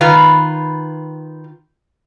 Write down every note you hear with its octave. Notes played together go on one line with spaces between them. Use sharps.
D#3 F4 B4